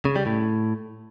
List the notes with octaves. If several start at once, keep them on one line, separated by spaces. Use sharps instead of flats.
C#3
G3
A2